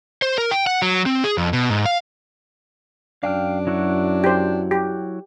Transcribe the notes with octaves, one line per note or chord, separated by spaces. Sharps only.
C5
A#4
G5
F#5
F#3
C4
G#4
F2
B2
G#2
F5
F#2 D4 F5 G5 F6
F#3 E4 F#4
G4 C5
G4